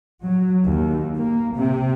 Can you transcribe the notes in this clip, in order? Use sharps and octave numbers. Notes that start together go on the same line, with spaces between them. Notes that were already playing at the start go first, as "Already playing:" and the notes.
F#3
D#2
A#3
C3